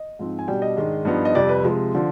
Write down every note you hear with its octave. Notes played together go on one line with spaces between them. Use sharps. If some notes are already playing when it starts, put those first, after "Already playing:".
Already playing: D#5
G#2 F3 C4
G#5
B2 G3 D4 G5
D#5
G#2 D#3 G#3 D4
G2 F3 B3 D#4
D#5
F2 C3 G3 D5
B4
C3 F3 G#3
D3 F3